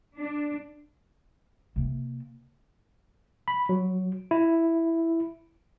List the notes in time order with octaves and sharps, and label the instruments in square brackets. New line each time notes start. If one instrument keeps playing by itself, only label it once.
[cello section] D4
[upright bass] C3 A#3
[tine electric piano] B5
F#3
E4